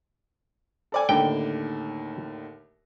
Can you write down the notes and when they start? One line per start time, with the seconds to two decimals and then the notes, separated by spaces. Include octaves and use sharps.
0.92 A4 D5 G#5
1.09 D#2 A2 D3 G5